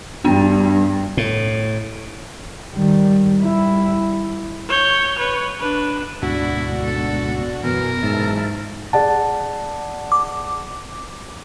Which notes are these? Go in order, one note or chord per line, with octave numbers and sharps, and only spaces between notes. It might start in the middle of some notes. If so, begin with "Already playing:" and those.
G2 B3 D4 G5
A2
D#3 G3
G3 E4
C#5 G6
B4 C#5
D4 B4
D2 G#2 B2 D4 E4 F#4
A4
F#2 B2 E3 A#4
G#2 E5 A5
G#4 D5 F#5 A5
D6